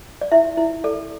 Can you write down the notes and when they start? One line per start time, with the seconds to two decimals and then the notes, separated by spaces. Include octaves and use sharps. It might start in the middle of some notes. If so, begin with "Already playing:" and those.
0.21 D5
0.32 E4 E5
0.57 E4
0.84 A4 D5